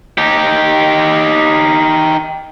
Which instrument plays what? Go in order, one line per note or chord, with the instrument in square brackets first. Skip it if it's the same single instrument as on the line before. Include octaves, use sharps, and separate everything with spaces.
[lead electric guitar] D#4 G4